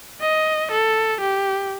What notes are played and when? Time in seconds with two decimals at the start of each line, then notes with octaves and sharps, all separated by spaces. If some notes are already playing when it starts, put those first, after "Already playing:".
0.21 D#5
0.72 A4
1.21 G4